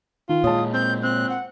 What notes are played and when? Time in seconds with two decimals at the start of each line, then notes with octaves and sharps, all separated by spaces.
0.29 D#3 F4
0.44 A#2 G#3 C#5 A5 D#6
0.74 C4 G6
1.03 C4 F#6
1.30 F#5